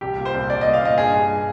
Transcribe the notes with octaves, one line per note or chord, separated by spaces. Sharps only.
C2 G4
A#2
C5
C2
C2 D5
A#2 D#5
F5
A#2 D#5
G2 G#4
G2